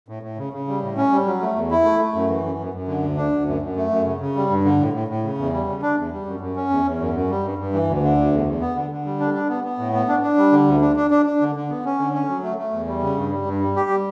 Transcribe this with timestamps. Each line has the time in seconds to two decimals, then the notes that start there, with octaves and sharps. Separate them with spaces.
0.08 A2
0.23 A2
0.37 C#3
0.53 C#3
0.68 G3
0.82 A2
0.97 C#4
1.12 G3
1.26 F#3
1.41 A3
1.56 E2
1.71 E4
1.85 A3
2.00 A3
2.14 F#2
2.29 E3
2.44 F#2
2.59 F#2
2.74 F#2
2.88 D3
3.02 D2
3.17 D4
3.32 D2
3.47 F#2
3.62 F#2
3.76 A3
3.91 F#2
4.05 C#3
4.20 C#3
4.35 G3
4.50 G2
4.64 D3
4.80 A2
4.93 A2
5.08 A2
5.23 C#3
5.38 E2
5.53 G3
5.67 C#3
5.82 D4
5.96 E2
6.11 G3
6.26 F#2
6.41 F#2
6.56 C#4
6.70 E2
6.85 E2
6.99 F#2
7.14 F#2
7.29 G3
7.44 G2
7.58 G2
7.73 E3
7.88 D2
8.03 D3
8.17 D2
8.32 E2
8.46 E2
8.61 B3
8.75 D3
8.91 D3
9.05 G3
9.20 D4
9.34 D4
9.49 B3
9.64 B3
9.79 A2
9.93 B3
10.08 D4
10.23 D4
10.37 G3
10.52 D3
10.67 D2
10.81 D4
10.96 D4
11.11 D4
11.26 D4
11.41 D3
11.56 D3
11.69 B3
11.85 C#4
11.99 D3
12.14 C#4
12.29 F#3
12.43 A3
12.58 A3
12.73 E2
12.87 G3
13.02 C#3
13.17 G2
13.31 G3
13.46 G2
13.61 G3
13.76 G4
13.90 G3